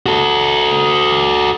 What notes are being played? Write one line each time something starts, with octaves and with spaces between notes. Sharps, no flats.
F#4 A4